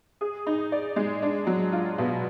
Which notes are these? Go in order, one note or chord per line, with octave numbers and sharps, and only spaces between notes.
G#4
D#4
D5
G#3
D4
F#3
F4
B2